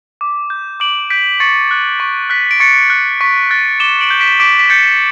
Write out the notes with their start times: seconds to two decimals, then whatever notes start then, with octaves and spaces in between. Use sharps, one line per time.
0.21 D6
0.50 G6
0.80 D6 D7 F#7
1.10 G6 B6 D7
1.40 C#6 A6 C#7
1.71 F#6
2.00 C#6 B6
2.30 F#6 B6
2.51 D7
2.60 C#6 A6 C#7
2.90 F#6
3.21 C#6 B6
3.51 F#6 A6
3.80 D6 E7 G7
4.01 D7 F#7
4.10 G6
4.20 B6 D7
4.40 D6 B6 D7
4.59 B6
4.70 G6 A6 C#7